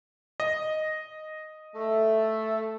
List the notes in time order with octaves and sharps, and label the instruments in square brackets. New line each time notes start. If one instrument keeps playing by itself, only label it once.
[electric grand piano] D#5
[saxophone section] A3